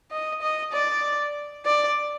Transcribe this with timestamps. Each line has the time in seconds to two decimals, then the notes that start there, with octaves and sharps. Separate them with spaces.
0.11 D#5
0.42 D#5
0.72 D5
1.66 D5